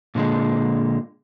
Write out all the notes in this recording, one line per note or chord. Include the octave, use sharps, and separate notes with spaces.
A#2 D3 G3 G#3